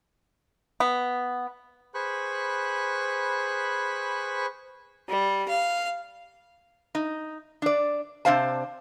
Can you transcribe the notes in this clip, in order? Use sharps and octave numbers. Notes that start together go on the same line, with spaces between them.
B3
G#4 B4 C5 B5 C#6 F#6
G3
F5
D#4
D4 D5
C3 D4 C5 F5 A5